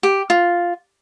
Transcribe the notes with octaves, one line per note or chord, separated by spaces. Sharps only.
G4
F4